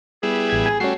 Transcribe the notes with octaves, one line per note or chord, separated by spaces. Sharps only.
G3 B3 E4 G#4
A1 G#6
G#5
G3 A3 C#4 F#4 C7